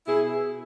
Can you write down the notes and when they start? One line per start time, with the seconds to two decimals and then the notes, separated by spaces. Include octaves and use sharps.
0.06 B2 E4 G#4